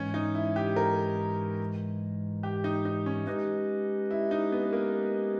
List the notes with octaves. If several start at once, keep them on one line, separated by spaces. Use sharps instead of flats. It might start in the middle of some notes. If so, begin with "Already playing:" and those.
Already playing: G#2 E3 G#3 C#4
D#4
E4
G4
A#4
G4
D#4
D#4
C#4
G#3 C#4 D#4 G4 B4 D#5
E4
D#4
B3
A#3